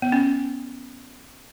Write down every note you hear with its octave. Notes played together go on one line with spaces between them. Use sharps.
B3
C#4